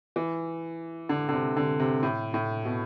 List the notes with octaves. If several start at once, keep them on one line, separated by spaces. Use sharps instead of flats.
E3
D3
D3
C3
D3
C3
A2
A2
B2